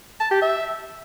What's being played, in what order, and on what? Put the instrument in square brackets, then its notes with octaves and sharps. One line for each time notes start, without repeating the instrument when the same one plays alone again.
[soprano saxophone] A5
G4
E5